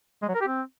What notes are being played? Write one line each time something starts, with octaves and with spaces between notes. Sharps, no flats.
G#3
F#3
A#4
G4
C4